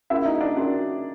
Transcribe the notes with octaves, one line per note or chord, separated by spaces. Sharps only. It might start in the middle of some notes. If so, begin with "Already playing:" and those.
C#4 E4 F#4 A#4 E5
D#4 D#5
D4 D5
C#4 F#4 A#4